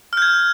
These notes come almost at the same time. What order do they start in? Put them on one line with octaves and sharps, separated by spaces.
F6 G6 G#6